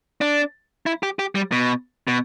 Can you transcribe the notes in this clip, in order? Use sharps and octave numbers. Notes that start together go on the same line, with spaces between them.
D4
E4
G4
G4
G3
B2
B2